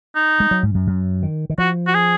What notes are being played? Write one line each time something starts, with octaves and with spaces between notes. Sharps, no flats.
D#4
G#3
F#3
G#2
F#2
F#2
D#3
D#3
F3 F#4
F#4
G#4